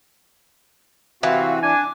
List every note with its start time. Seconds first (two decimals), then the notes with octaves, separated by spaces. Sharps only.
1.23 C3 E3 C4 F#4 F5
1.63 D4 G#5 D6